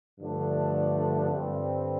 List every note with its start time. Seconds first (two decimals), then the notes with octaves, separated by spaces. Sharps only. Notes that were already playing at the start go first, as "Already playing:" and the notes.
0.19 G2 D3 F3 A3 D4
1.29 G2 D3 G3 C4